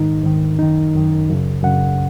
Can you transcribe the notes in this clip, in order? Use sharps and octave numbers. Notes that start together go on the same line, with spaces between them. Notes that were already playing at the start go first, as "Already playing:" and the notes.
Already playing: G#2 D#3 D#4
G#2 D#3
F#2 D#3 D#4
F#2 D#3
F#2 C#3
F#2 C#3 F#5